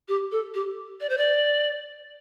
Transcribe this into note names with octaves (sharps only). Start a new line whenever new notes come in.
G4
A4
G4
D5
C5
D5